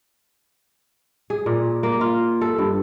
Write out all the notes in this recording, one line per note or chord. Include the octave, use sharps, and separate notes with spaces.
G#4
A#2
A#3
F4
A4
G2